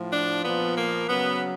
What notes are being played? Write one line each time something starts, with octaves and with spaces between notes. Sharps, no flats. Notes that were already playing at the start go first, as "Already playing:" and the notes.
Already playing: A2 F3
D4
A#2 F3 B3
A#3
C#3 F#3 B3